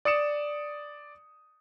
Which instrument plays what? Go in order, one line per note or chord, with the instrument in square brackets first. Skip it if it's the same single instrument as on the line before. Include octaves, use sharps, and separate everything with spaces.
[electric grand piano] D5 D#6 C#7 E7